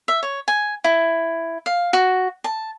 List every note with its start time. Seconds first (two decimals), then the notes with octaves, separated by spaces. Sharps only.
0.08 E5
0.23 C#5
0.48 G#5
0.84 E4
1.66 F5
1.93 F#4
2.44 A5